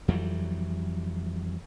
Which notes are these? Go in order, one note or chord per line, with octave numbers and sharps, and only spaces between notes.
F2 E3 F#3 G3